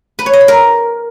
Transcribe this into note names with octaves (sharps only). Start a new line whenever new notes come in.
B4
C#5
D#5
B5
A#4